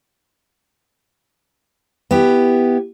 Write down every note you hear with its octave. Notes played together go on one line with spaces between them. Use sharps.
B3 E4 G4